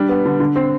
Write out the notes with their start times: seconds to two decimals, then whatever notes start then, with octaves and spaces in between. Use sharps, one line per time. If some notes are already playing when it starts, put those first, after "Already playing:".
Already playing: G3 D4
0.09 B3
0.26 D3
0.40 D3
0.56 C4